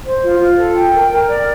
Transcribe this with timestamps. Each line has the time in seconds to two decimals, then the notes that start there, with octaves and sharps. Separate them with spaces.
0.04 C5
0.22 F4
0.39 F4
0.57 A4
0.76 G5
0.93 A#4
1.11 A#4
1.28 D5